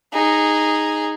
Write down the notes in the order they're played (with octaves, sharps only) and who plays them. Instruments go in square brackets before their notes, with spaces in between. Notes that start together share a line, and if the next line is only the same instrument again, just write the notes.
[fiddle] D#4 G#4